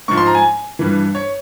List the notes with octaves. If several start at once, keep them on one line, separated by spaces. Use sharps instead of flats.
G#2 F3 C#6
C6
A#5
G#5
G2 E3
C#5